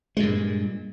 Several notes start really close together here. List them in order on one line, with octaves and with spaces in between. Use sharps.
G#3 A#2 G2